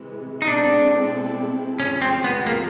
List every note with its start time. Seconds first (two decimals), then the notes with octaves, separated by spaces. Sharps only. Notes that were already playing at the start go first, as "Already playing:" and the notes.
Already playing: C3 E3 G#3
0.42 D#4
0.48 B2 G#3 C4 D4 E4 A4
1.80 E2 C3 F3 G#3 C#4
2.02 C4
2.24 B3
2.46 A#3